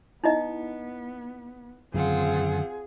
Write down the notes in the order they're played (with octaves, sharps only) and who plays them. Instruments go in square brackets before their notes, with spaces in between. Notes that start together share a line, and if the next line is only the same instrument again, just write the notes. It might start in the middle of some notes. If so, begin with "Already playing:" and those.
[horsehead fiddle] B3 [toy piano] D#4 E4 D#5
[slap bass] F#2 D3 D#3 [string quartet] C4 F4 F#5 [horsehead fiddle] G#4